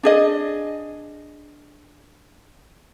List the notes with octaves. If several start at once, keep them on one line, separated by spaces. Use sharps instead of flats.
D4 G#4 D#5